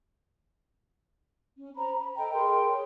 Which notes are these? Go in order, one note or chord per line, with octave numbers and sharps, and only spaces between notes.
C#4
C5 A#5 B5
B5
A4 D#5 G5 A#5
G#4 A#4 G5 C6
C#5